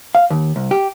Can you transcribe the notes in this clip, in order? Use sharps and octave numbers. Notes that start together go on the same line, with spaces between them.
F5
D#2
C2
G4